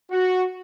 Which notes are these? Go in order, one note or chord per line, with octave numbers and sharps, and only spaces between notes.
F#4